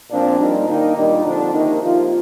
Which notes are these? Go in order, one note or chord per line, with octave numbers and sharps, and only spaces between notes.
A#2 F3 C4 D4
A#2 G3 A#3 D4 D#4
D#3 A#3 D4 D#4
A#2 G3 D4 D#4
D3 F3 C4 D4
C3 D#3 A#3 D4 D#4
C3 F3 A#3 F4